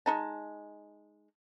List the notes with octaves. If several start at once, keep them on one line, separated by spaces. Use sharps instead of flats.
G#3 D#4 A5